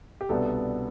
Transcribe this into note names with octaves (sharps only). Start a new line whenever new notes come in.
G4
C2 B2 B3 D4 A4